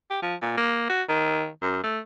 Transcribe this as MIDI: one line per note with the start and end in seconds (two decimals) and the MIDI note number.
0.10 0.19 67
0.22 0.35 53
0.42 0.54 46
0.57 0.84 58
0.89 1.02 66
1.09 1.48 51
1.62 1.83 42
1.83 1.99 57